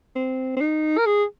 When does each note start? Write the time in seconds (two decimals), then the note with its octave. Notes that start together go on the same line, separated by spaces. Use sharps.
0.16 C4
0.57 C4
0.61 D#4
0.98 A#4
1.06 G#4